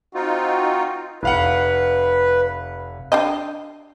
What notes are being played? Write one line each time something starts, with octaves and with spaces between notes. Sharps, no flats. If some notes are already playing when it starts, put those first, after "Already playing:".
C4 D#4 F4 F#4
F1 B4 F5 F#5
D4 G4 D#5